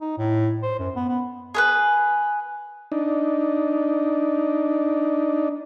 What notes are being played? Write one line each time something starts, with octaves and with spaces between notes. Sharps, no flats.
D#4
A2
C5
F#2
B3
B3
G#4 A#4 B4
D4 D#4